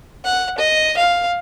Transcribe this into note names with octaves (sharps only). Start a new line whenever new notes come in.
F#5
D#5
F5